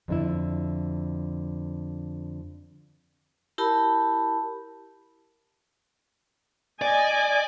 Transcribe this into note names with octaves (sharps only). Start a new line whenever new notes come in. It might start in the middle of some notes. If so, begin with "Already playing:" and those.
F2 D3 E4
E4 G4 A#4 A5 B5
D5 D#5 G#5